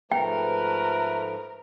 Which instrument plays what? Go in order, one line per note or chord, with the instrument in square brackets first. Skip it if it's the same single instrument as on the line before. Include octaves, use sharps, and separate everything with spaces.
[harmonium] G#2 F3 A3 [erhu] A#4 [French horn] B4 [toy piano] G5